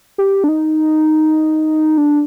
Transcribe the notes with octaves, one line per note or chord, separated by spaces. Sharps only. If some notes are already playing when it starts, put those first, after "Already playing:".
G4
D4
D#4
D4